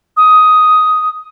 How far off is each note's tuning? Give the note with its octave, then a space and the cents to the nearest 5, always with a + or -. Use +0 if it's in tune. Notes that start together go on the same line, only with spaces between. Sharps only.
D#6 +10